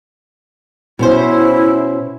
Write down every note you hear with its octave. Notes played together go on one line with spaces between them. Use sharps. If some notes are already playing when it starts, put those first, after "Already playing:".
B2 C#4 E4 C5